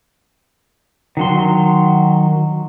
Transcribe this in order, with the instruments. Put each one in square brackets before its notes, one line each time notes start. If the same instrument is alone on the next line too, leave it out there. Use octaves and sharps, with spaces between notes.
[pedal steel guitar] D#3 F#3 C6